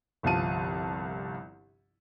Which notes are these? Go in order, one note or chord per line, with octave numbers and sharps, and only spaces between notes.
G1 C2 F3 F4 A5 D#7